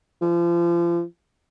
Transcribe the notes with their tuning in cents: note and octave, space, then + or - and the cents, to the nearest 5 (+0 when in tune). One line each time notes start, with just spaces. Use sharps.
F3 -35